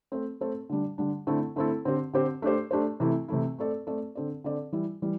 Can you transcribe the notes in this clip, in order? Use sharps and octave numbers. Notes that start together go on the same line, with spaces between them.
A3 C4 A4 C5
A3 C4 A4 C5
D3 G3 D4
D3 G3 D4
D3 A3 C4 E4 A4
D3 A3 C4 E4 A4
D3 C4 G4 C5
D3 C4 G4 C5
A3 D4 G4 C5
A3 D4 G4 C5
C3 E3 A3 E4
C3 E3 A3 E4
A3 C4 A4 D5
A3 C4 A4 D5
D3 C4 A4 D5
D3 C4 A4 D5
E3 G3 E4
E3 G3